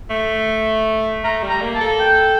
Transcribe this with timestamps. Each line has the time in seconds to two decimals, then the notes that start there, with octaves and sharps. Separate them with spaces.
0.10 A3
1.24 A3 A#5
1.43 G3
1.50 A#5
1.62 A#3
1.75 A5
1.81 A4
2.00 G5